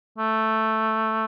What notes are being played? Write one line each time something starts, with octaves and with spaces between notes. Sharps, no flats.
A3